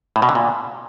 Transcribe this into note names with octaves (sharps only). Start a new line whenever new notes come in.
A2
B2
D3
A#2